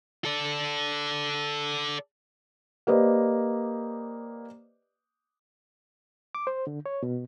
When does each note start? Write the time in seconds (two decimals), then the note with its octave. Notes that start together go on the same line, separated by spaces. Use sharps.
0.25 A4 D5
2.87 A#3 G4 B4 C5 D5 D#5
6.35 D6
6.47 C5
6.67 D3
6.86 C#5
7.03 B2